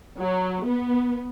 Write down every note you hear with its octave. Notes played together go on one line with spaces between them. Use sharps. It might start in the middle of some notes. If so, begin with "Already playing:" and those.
F#3
B3